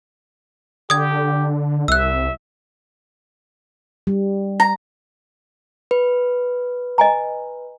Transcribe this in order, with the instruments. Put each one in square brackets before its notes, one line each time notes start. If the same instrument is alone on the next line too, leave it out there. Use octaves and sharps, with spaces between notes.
[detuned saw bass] D3 [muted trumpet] G4 [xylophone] D#6 G#6
[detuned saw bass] C2 [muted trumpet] E5 [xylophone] E6 F#6
[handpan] G3
[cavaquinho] A#5
[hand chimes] B4
[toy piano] D#5 G#5 A#5